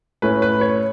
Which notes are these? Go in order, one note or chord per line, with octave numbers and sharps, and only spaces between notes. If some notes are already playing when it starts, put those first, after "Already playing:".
A2 A3 C#4 B4
B4
C#5